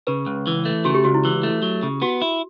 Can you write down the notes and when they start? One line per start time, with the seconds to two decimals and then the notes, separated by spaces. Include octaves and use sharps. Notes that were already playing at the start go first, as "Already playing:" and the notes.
0.07 C#3 B4
0.26 C#2
0.47 E3
0.65 A3
0.85 C#3 F#4
0.95 G4
1.04 C#2 F#4
1.14 E4
1.25 E3
1.43 A3
1.62 F#3
1.83 C#3
2.02 B3 F#4
2.22 E4